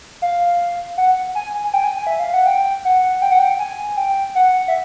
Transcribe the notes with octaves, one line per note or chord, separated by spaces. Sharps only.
F5
F#5
G#5
G#5
G5
G#5
E5
F5
F#5
G5
F#5
G5
F#5
G5
G#5
G5
F#5
E5